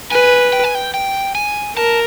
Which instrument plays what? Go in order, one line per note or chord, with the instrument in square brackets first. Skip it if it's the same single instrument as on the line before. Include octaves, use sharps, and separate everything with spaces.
[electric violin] B4 [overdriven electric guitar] G#5
[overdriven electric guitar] G5
G#5
G5
G5
G#5
[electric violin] A#4 [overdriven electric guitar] A5